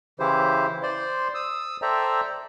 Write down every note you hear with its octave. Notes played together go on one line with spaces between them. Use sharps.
C#3 E3 E4 G4 C5
C5 D5 C6
D#6 E6
A4 C5 D5 E5 G5 A#5